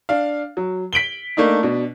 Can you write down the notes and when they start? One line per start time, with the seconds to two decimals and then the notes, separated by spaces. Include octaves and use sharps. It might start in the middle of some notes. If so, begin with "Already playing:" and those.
0.09 D4 F5
0.57 F#3
0.93 B6 D7 F#7 G7
1.37 A3 A#3 D4 D#4
1.63 B2 D4